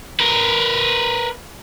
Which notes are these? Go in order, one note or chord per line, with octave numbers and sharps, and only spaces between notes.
A#4 B4